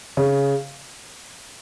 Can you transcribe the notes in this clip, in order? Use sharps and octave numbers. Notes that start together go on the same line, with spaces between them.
C#3